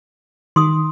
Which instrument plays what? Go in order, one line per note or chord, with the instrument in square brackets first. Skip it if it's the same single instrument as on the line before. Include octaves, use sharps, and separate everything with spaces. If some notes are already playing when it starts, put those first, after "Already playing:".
[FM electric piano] D#3 [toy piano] C6 D#6